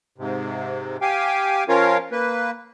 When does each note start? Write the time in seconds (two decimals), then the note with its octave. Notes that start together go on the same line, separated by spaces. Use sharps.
0.18 G#2 C3
1.01 G4 F5 G5 G#5
1.69 F3 C#4 F4 A#4 C#5 F5
2.12 A#3 B4